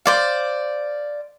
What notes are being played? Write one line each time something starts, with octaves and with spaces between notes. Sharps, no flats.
C5 D5 F5